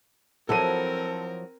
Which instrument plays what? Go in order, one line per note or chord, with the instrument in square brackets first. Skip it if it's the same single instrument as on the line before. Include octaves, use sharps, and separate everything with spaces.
[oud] F3 F#3 E4 [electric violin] C4 A#4 [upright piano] A4 D#7